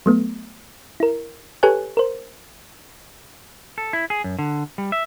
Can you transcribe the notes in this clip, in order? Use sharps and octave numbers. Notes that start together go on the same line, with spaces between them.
F#3 A3 B3
E4 A#4
G4 A4 B4 C#5 G#5 F#6
A#4 C5
A4
E4
G#4
F#2
D3
G3
E5